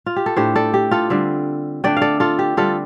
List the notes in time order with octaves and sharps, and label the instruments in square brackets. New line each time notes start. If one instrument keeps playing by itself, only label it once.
[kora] F4
G4
A4
A2 A3 D4 G4 C5
A4 D5
G4
F4 A4
D3 G3 C4
D3 A3 D4 D5 G5
F5
A4 D5
F4 A4
G4
D3 G3 C4 F4 A4